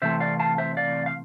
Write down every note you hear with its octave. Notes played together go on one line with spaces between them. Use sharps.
C3 E3 A3 C4 C5 E5
D5 F5
F5 A5
C5 E5
D5 F5
F5